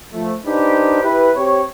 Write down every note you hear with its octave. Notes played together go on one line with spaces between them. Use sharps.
F3 A3
D4 D#4 G4 B4 C5
E4 G4 B4
C4 G4 C#5